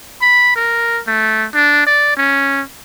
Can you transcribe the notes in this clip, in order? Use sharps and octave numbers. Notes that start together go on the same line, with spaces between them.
B5
A#4
A3
D4
D5
C#4